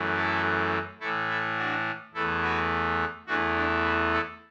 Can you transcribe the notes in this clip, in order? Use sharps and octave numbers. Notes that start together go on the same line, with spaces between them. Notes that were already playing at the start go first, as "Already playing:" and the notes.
Already playing: F#2 E3 A3
E4 A4
A2 E3 A3 E4 A4
E4 A4
D4 F#4
E2 E3 A3 E4 A4
F#4 B4
E2 E3 A3 D4 F#4
D4
E4
E4 A4